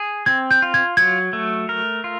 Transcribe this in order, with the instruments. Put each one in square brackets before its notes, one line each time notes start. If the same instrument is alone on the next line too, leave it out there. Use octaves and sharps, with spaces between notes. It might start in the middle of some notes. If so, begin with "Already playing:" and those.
Already playing: [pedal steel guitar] G#4
[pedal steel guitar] C4 [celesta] G#6
[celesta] G6
[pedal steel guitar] F4
[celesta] G#6
[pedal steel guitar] F#3 [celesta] G#6
[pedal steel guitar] A3
A#4
F4